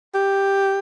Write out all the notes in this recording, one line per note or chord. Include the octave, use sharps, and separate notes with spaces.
G4